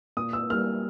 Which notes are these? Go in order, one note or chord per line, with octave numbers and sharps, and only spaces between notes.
A#2 D#6
E6
G3 A#3 F6